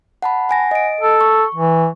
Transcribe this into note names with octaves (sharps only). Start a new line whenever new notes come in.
F#5 A5 B5
F#5 G#5 A#6
D#5 D7
A4
C#6
E3